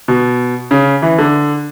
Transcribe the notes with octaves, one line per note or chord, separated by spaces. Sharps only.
B2
C#3
E3
D3